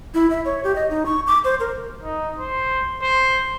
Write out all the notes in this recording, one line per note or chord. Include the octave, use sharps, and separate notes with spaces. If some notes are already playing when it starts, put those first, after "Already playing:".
E4
E5
C#5
G4
D#5
D#4
C#6
D6
C5
A#4
D#4
C5
C5